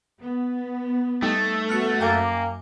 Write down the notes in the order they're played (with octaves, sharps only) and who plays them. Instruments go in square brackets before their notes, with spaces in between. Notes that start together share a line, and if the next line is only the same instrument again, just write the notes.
[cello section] B3
[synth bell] G3 D#4 [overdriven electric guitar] A3
[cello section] B3 F#4 [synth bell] F6 F#6 C#7
[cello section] F#2 [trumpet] A#3 [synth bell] G5 G#5 D6